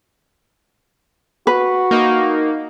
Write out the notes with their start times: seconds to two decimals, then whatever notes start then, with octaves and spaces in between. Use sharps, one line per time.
1.47 F#4 B4
1.91 A#3 D#4